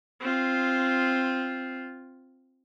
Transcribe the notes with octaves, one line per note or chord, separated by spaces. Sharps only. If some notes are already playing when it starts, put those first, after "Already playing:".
C4 F4